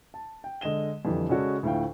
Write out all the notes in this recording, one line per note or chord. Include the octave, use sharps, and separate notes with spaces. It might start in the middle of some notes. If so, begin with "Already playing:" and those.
A5
G5
D3 G#3 D#5 E7 G7
F2 D3 E3 G3
C#3 G#3 C#4 F#4 A4 D5
D2 A2 F3 F5 G5